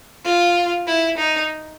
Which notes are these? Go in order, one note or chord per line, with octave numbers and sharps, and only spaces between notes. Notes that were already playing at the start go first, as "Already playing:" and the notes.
F4
E4
D#4